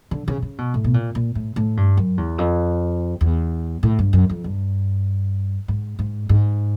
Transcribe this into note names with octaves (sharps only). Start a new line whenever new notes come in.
D3
C#3
C#3
B2
A2
B2
A#2
A#2
A2
A2
G2
F#2
E2
F2
E2
A2
G2
F#2
F2
G2
G#2
G#2
G#2